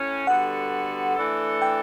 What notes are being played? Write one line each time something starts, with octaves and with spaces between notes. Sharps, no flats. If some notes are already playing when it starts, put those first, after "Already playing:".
Already playing: A2 C#4
D3 G3 B3 F#4 A4 F#5
E3 A3 D4 A4
G5